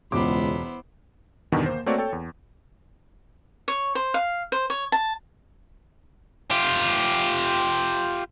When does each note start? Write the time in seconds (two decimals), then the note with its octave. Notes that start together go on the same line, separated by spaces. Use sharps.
0.12 E1 C#2 B3 E4 C5 D6
1.52 E2 G2 B2 D3 D#3
1.66 A#3 C5
1.86 A3 A#3 C4 F#4 C#5 D5
1.98 A4 C#5 G5
2.13 E2
3.68 C#5
3.95 C5
4.14 F5
4.52 C5
4.70 C#5
4.92 A5
6.51 F4 G4